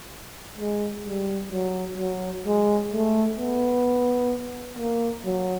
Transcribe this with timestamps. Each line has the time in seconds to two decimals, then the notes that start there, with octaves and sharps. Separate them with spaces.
0.58 G#3
1.06 G3
1.52 F#3
1.98 F#3
2.46 G#3
2.92 A3
3.38 B3
4.79 A#3
5.25 F#3